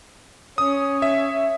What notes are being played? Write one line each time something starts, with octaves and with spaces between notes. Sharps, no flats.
C#4 D#6
E5